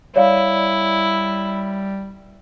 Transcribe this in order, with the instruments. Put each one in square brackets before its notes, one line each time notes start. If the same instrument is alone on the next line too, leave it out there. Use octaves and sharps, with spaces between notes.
[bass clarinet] G3 [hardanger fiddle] E4 [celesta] C#5 D5 F5